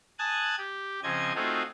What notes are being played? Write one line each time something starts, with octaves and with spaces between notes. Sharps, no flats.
G#5 A5 D#6 F#6 G#6
G4
C#3 F3 C4 D#5 G#6
A3 C4 D#4 F4 F#4 G#4